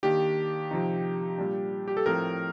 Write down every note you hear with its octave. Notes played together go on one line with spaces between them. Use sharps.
D#3 A#3 D4 G4
C3 F3 C4 D#4
A#2 G3 D4
G4
A4
A2 F3 C4 A#4